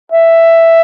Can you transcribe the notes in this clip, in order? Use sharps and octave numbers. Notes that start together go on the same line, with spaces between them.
E5